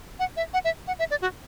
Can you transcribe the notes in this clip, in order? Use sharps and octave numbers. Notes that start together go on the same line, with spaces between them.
F#5
E5
F#5
E5
F#5
E5
D5
F#4